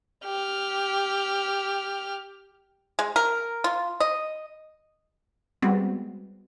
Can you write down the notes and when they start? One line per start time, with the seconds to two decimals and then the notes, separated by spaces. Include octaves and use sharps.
0.25 G4 F6
2.99 G#3
3.16 A#4
3.64 F4
4.00 D#5
5.62 G3 G#3 B3 C4 F#4